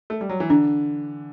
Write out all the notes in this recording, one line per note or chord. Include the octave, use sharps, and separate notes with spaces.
A3
G3
F#3
E3
D3 D4